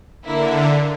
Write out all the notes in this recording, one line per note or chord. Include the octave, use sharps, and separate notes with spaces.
D3 A#3 E4 A#4 E5